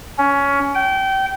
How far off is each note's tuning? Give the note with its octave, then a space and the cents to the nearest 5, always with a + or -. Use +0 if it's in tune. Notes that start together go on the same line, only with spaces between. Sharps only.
C#4 +15
G5 -25